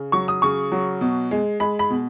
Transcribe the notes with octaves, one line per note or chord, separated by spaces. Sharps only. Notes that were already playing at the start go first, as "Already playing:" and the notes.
Already playing: C#3
F#3 C#6
D#6
C#3 C#6
F#3
B2
G#3
G#3 B5
B5
B2